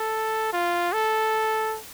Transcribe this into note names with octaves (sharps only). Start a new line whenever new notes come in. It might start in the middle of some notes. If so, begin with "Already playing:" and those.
Already playing: A4
F4
A4